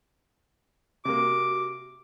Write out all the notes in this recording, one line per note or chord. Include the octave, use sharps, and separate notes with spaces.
C3 A#3 F#4 D6